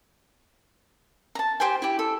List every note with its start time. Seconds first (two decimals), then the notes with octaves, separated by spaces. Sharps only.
1.35 A5 A#5
1.60 G4 C5 G5 G#5
1.82 E4 G4
1.99 A4